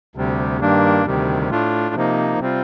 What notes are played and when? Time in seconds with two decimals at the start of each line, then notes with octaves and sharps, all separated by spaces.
0.15 D2 C3 G3
0.60 G2 D#3 G3 A#3 D4
1.06 D2 C3 D#3 G3
1.51 A2 A3 D4 F4
1.95 C3 F3 A#3 D#4
2.39 C3 G3 C4 F4